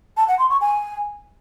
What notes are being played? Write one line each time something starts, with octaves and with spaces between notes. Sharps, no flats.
A5
F#5
C6
C#6
G#5